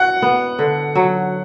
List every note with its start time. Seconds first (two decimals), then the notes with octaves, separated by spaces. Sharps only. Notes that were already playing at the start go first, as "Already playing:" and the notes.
Already playing: F#4 F#5
0.22 B3
0.59 D3
0.95 F#3